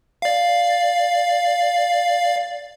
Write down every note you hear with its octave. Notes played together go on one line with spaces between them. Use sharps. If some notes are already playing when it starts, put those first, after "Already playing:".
D5 F5